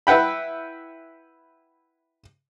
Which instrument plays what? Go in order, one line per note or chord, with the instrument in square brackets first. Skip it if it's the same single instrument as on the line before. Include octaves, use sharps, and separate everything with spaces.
[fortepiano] E4 B4 F#5 G5 B5